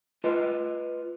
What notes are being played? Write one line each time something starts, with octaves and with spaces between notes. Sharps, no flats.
F4 B4 D#5